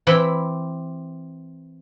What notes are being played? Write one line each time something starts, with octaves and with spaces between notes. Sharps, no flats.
E3 C4 G4 G5 B5